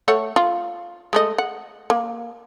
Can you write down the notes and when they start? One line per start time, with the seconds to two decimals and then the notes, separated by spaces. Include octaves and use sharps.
0.08 A3 C#5 F#5
0.36 F4
1.13 G#3 A3 D#5
1.38 F#5
1.90 A#3